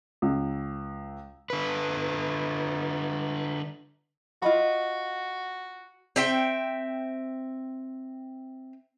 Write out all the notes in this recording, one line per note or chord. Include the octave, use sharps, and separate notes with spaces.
C#2
D3 B4
F4 F#4 D#5 B5
C4 E5 G5